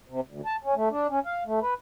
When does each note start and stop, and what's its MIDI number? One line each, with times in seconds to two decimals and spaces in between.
0.08 0.20 48
0.28 0.41 38
0.46 0.56 81
0.63 0.74 61
0.75 0.89 57
0.91 1.07 62
1.09 1.19 61
1.25 1.43 77
1.46 1.59 57
1.61 1.74 71